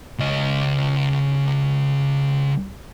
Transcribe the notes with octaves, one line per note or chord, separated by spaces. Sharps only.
C#2 D#5